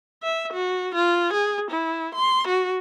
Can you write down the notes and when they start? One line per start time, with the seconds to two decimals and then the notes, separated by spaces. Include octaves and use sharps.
0.23 E5
0.53 F#4
0.95 F4
1.33 G#4
1.71 E4
2.15 C6
2.47 F#4